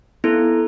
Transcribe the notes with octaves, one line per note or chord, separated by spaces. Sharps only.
B3 E4 A4